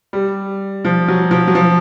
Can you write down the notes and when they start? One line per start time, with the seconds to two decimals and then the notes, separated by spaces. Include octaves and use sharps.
0.13 G3
0.85 F3
1.08 F#3
1.31 F3
1.47 F#3
1.55 F3